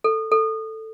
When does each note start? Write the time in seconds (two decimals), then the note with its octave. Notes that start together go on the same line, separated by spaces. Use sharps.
0.04 A4
0.32 A4